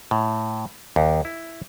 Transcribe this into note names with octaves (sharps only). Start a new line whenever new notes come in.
A2
D#2
E4